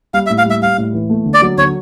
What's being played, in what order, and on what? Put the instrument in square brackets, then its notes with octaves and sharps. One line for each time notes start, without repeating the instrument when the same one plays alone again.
[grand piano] G3 [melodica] F5
[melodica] E5
[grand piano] A2
[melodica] F5
[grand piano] G3 [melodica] E5
[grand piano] G3 [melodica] F5
[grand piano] A2
E3
A3
D3
[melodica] D5
[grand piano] F#3
[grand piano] D3 [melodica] C#5